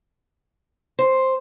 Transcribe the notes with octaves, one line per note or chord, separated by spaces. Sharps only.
C5